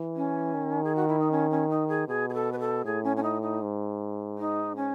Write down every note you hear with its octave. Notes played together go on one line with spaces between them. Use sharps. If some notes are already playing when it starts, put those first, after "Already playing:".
Already playing: E3
C#4
D#3
G#4
F#4
E4
D#4
C#4
C#4
D#4
G#4
B2 G#4
G#4
A4
B4
A4
A2 G#4
C#4
C#4
D#4
D#4
G#2
D#4
C#4